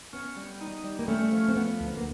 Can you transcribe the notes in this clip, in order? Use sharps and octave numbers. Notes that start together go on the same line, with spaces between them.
B3 C#4
G3
D#4
G3
A#3
A3 C#4
F3
C4
F3 B3
D2
A#3